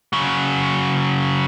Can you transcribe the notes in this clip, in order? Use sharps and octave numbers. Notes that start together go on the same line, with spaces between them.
C#3 F#3